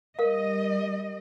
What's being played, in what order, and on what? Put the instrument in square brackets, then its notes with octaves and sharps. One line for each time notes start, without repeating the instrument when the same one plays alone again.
[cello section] G3 D#5 [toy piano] A#4 F5